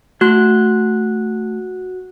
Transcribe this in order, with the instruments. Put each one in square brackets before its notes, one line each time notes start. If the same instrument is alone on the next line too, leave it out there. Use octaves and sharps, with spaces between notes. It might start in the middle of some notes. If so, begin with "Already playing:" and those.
[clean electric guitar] A3 C6 [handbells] F#4 F#6